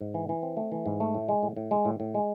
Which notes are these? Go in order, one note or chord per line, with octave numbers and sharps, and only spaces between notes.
G#2
E3
E3
C4
A3
E3
G#2
A3
A2
G#3
A2
A2
G#3
A2
A2
G#3